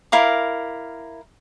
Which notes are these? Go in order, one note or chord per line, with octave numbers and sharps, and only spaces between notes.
E4 A#4 F5 D6